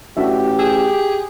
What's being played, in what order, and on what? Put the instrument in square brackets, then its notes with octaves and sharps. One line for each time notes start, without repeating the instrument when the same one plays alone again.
[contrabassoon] A1 [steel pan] D4 F#4 E5 [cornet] G4
[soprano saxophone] G#4 [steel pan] E6